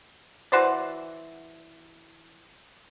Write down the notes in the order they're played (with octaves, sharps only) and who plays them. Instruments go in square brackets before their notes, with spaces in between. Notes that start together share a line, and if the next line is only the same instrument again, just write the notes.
[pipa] E3 F#4 C5 D5